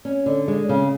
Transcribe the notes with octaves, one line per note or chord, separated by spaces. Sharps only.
C#4
D3
G#3
C#3